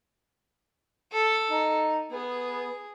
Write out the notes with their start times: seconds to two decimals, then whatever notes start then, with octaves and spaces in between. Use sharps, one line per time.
1.12 A4
1.50 D#4
2.12 B3 G#4